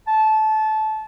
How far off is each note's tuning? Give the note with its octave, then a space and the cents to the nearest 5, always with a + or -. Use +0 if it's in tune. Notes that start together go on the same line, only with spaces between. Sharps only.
A5 -20